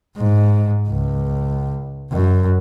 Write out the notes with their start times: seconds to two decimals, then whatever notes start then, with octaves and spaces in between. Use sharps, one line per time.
0.17 G#2
0.88 C#2
2.12 F#2